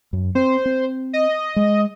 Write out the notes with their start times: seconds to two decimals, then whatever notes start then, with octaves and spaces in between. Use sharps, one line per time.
0.13 F#2
0.35 C4 C5
0.65 C4
1.13 D#5
1.56 G#3